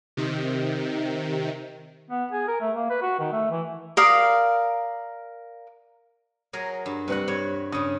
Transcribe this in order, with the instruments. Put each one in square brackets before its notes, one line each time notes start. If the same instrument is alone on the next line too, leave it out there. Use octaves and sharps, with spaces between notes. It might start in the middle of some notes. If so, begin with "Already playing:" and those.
[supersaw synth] C3 D#3
[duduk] B3
G#4
A#4
A3
A#3
B4
F#4
D#3
A3
E3
[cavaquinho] A#4 D5 F5 D#6
[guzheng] F#3 G#4 A#4
G2
[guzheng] C3 F#4 F#5 [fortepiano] G3 B4 F#6
[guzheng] G2 C#5
[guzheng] G2 C#3 [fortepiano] D#6